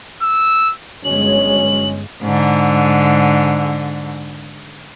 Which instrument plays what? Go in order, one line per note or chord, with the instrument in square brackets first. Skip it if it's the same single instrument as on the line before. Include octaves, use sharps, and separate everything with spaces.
[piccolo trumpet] E6
[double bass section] G1 G#3 [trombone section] B2 F#3 C#4 [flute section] C#5 [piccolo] F#7
[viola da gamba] G#2 D3